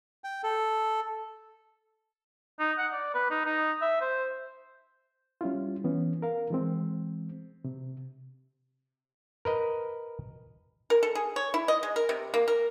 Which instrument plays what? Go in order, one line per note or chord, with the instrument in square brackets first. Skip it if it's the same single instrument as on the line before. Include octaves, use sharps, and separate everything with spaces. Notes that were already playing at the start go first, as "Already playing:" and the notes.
[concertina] G5
A4
[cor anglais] D#4
F#5
D5
B4
D#4
D#4
E5
C5
[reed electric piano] G3 C#4 E4 F4
E3 B3 C#4
A#4 F5
E3 G#3 C4
C3
[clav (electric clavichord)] A#4 B4 D#5
[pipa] A#4
A4
G#4
C#5
E4
D#5
G#3
A#4
C3
A#3
A#4